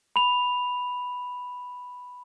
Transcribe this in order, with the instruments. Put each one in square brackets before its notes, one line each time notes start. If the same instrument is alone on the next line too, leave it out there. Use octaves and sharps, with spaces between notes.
[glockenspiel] B5 F7